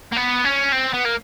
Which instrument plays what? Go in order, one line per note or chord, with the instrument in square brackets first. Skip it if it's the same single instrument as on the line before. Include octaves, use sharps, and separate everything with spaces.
[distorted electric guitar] A#3
B3
C#4
C4
B3
A#3